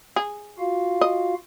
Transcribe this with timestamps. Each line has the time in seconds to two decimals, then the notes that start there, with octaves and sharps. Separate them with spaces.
0.16 G#4
0.58 F4 F#4 F5
1.01 D#5